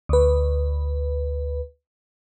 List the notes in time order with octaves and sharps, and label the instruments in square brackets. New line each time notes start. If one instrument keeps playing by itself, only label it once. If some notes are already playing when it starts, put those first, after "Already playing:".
[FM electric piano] D2 B4